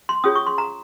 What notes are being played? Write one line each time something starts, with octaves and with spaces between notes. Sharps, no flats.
C6
C#4 F4 G#4 C#5 D#6
C#6
C6
A#5